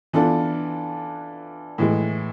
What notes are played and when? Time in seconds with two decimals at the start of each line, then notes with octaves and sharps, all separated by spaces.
0.13 E3 B3 D4 F4 A4
1.78 A2 E3 G#3